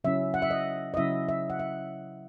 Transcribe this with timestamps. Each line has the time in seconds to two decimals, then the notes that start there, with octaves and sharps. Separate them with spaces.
0.04 C#3 F#3 C#4 E4 E5
0.34 F#5
0.42 E5
0.51 D#5
0.94 D#5
0.97 C#3 F#3 C#4 E4 E5
1.29 E5
1.50 F#5
1.59 E5